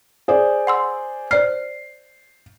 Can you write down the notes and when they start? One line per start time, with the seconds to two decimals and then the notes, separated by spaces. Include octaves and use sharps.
0.28 G#4 C5 D5
0.67 F#5 C6 E6
1.31 C5 D5 F6 C7